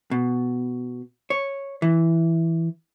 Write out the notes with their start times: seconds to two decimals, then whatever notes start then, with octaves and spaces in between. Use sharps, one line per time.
0.11 B2
1.30 C#5
1.82 E3